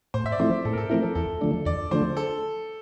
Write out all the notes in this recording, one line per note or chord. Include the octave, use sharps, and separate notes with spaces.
A2 C5
E5
D5
F3 A3 C4 E4 C5
A2 A4
A#4
A4
F3 A3 C4 E4 A#4
A4
E2 A4
D3 F3 A3 D4
E2 D5
D3 F3 A3 D4 C5
A4